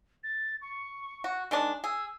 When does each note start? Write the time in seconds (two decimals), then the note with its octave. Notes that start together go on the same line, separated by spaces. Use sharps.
0.23 A6
0.61 C#6
1.24 F#4
1.51 D#3 G#3 D4
1.84 G#4 E6